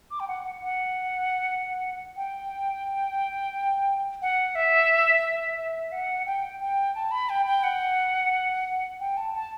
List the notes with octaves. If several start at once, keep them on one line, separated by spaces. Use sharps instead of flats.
D6
G5
F#5
F#5
F#5
G5
F#5
E5
E5
F#5
G5
G5
A5
B5
G5
G5
F#5
G5
A5
A5